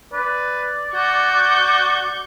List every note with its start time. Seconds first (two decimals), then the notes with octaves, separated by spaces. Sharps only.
0.13 B4 D5
0.95 F#4 C#6 D6 G6